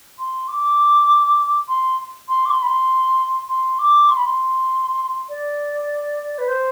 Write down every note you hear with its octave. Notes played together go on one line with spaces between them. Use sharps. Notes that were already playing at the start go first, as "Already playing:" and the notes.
C6
D6
C6
C6
D6
C6
B5
C6
C6
D6
C6
B5
C6
D5
B4
C5